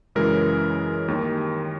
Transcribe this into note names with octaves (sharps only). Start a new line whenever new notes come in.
F#2 C#3 E3 G#3 A#4
D#2 D#3 G3